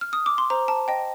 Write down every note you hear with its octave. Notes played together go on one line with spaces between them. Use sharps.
F6
D#6
D6
C6
C5 A#5
A5
D#5 G5